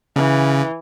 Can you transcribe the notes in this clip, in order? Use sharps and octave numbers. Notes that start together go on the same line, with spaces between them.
C#3 E3